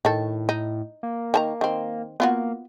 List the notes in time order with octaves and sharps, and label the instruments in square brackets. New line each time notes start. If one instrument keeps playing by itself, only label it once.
[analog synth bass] A2 [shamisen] D#3 A4
[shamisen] D#4
[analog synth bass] A#3
[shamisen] D#3 A5 A#5
D#3 C4
[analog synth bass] A#3 [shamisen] B3 F4 F#4